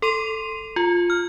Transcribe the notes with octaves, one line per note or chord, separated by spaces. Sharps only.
A4 C6 D#7 F7
F4
F6